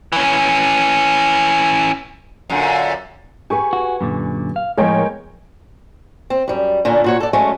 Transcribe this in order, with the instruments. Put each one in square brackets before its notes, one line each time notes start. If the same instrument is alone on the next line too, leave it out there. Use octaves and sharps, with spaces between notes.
[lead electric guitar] E3 C#4
[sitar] F#2 A#2 D3
[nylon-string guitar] G4 G#4 B4 [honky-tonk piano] G#5 C#6
[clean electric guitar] F#4
F#2 A#2 D3
F5
[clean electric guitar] A2 F3 [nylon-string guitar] G#3 B3 [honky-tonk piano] A#4 C#5 G5
[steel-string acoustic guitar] C4
F#2 G3
A#2 D3 A#3 C#4
A#2 F#4 C#5
A4 D5
F#3 G#3 A3 C#4